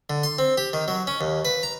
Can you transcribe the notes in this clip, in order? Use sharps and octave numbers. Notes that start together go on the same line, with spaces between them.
D3
C6
C4
G4
D#3
F#3
C#4
D#2
B4
A#5